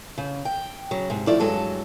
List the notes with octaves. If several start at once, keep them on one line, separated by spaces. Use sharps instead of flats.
C#3
G5
C#3 F#3
G#2 C3
D#3 F3 A3 E4 D5
G2 E3 F#3 G#3 A4